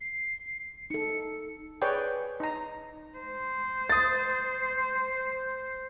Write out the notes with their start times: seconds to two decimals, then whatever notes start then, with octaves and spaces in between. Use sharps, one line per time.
0.01 C7
0.90 D#4 A4 C#7
1.82 G#4 B4 C#5 D5 G5
2.40 D#4 A#5
3.18 C5
3.90 D#6 A6